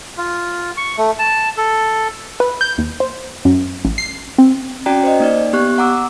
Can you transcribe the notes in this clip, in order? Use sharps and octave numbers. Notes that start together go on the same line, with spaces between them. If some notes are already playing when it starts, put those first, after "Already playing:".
F4
C#6
A3
A5
A4
B4
G6
D#2
C5
F#2
A1
C7
C4
C#4 F#4 D5 G5 A#5
C5 D#5
A#3 D#4 D5
B3 G4 C#6 F#6
F#5 A#5 D6 E6